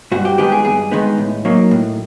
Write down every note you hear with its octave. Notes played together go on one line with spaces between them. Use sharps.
G2 F#4
G4
D#3 G#3 B3 D#4 G4
G#4
G2 G#4
D#3 G#3 B3 D#4
A2
F#3 A#3 D#4
A2